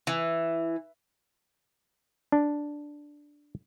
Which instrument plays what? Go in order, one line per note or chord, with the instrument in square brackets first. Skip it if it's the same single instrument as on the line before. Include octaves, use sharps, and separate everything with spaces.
[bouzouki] E3
[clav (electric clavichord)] D4